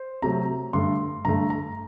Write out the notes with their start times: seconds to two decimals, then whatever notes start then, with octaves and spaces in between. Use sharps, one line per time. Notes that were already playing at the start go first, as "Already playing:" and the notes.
Already playing: C5
0.22 C3 F#3 A3 A#5
0.73 G2 D3 A3 C6
1.25 G2 D3 A3 A#5
1.50 A#5